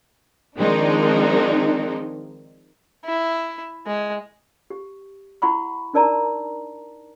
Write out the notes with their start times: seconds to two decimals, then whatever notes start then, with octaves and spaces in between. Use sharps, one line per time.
0.58 D#3 F3 G#3 C4 D4 D#4
3.05 E4
3.87 G#3
4.70 G4
5.42 E4 F#5 B5 C#6
5.94 D4 D#4 A#4 D5 A5 A#5